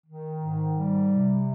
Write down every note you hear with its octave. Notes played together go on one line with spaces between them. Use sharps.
D#3
G#2
G3
C3